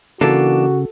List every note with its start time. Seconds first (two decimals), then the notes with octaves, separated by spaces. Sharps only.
0.21 C#3 E3 A#3 D4 F#4 A4